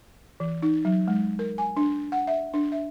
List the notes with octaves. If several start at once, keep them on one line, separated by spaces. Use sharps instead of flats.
E3
D#4
F#3
G#3
A#4
G#5
D4
F#5
E5
D4
E5